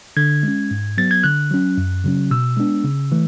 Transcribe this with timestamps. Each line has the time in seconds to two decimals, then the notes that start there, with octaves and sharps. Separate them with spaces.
0.17 D3 G#6
0.43 G#3 C#4
0.71 G#2
0.98 F#3 B3 A6
1.11 G#6
1.24 D3 F#6
1.51 F#3 C#4
1.78 F#2
2.04 C#3 F#3 C#4
2.31 B2 E6
2.57 G#3 B3 D4
2.84 C#3
3.12 E3 A3